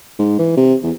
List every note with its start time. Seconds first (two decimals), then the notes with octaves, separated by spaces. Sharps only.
0.19 G#2
0.39 E3
0.57 C3
0.83 E2